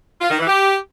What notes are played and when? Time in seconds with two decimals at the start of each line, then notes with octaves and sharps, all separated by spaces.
0.21 F4
0.30 D#3
0.39 E3
0.47 G4